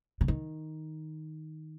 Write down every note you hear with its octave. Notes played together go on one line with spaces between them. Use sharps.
C#3
D#3